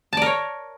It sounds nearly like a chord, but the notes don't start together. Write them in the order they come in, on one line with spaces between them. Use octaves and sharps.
A5 D5 A#4 C#5